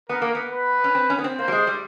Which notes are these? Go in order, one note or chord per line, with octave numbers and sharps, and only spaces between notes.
B3 A#4
A#3
B3
B4
C#4
C4
C#4
B3
C4
A#3 C5
G3
G#3
G3